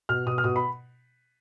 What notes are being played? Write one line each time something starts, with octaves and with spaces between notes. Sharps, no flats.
B2 F6
B2 D#6
F6
B2 D#6
B5